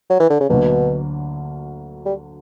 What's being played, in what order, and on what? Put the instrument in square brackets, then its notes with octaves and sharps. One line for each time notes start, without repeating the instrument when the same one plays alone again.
[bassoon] F#3
E3
D3
C#3
[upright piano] D2 D3 F#3 A#3 [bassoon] B2
[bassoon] G3